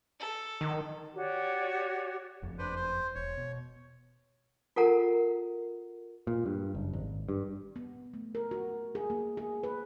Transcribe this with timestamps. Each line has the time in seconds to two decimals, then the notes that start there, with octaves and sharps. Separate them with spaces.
0.20 A4
0.61 D#3
1.14 F#4 G4 C#5 D5
2.42 F#1 F2
2.59 D4 B4 C5
2.76 C5
3.15 E1 C#5
3.37 B2
4.76 F4 A4 A#4 F#5 A#5
6.27 A#2
6.46 G2
6.75 F#1
6.93 G#1
7.29 G2
7.76 B3
8.14 A3
8.35 A#4
8.51 F#4
8.95 G#4
9.10 A#3
9.37 G#4
9.63 B4